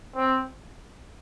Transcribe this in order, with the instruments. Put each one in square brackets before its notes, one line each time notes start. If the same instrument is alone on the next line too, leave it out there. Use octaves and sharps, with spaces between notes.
[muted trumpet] C4